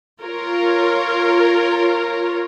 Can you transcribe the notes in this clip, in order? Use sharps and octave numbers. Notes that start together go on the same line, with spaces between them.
F4 A#4 C#5